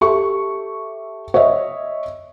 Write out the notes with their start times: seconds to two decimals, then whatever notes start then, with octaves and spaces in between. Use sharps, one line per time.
0.01 G4 A4 E5 C#6
1.34 C#5 D#5 E5